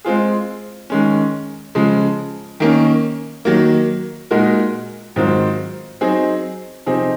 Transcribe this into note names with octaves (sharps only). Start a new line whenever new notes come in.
G#3 C4 F4 G#4
D#3 G#3 C#4
C#3 F3 G#3
D#3 A#3 C#4
D#3 F#3 A#3
A#2 G#3 D#4 F#4 A#4
G#2 D#3 F#3 C4 F4
F#3 C4 D#4 G#4
C3 F3 C4 D#4 G#4